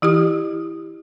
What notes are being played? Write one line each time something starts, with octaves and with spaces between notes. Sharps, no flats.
E3 E4 G4 D#6